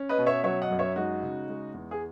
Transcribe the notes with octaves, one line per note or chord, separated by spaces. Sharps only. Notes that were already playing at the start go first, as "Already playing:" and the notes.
Already playing: C#4
B4 D#5
B2
C#5 E5
F#3 C#5 E5
D#5 F#5
F#2
C#5 E5
G#3 D#4 F#4
C#3
G#3
E2
G#4